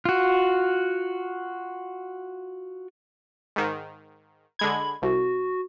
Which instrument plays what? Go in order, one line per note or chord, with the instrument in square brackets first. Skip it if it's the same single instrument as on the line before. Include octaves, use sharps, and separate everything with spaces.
[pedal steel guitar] F4 F#4
[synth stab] G#2 D#3
[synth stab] D3 G#3 G#6 [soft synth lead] B5
[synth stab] C2 [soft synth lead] F#4